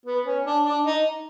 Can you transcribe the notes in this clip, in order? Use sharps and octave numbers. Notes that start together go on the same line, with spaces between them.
B3
C#4
D4
D4
D#4